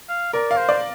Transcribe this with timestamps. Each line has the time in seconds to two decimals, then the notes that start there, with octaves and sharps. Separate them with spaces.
0.09 F5
0.33 A#4 D5
0.51 F5
0.57 C5
0.69 D5